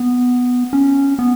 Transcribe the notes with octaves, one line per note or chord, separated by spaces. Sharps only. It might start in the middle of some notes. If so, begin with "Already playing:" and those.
Already playing: B3
C#4
B3